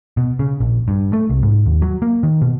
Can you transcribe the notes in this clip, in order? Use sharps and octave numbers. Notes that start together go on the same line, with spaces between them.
B2
C#3
A#1
G2
A3
C2
G#2
D#2
F#3
A#3
D#3
B2